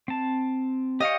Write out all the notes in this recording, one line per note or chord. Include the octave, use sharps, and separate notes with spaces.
C4 A5
G4 C#5 D#5 F5 G5